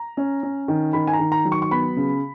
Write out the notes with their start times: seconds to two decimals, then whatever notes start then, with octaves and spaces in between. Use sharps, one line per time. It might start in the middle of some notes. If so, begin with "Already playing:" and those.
Already playing: A#5
0.17 C#4
0.43 C#4
0.68 D#3
0.93 D#3 B5
1.07 G#5
1.13 A#5
1.19 D#3
1.32 A#5
1.45 F#3
1.52 C#6
1.62 C#6
1.71 B3 B5
1.96 C#3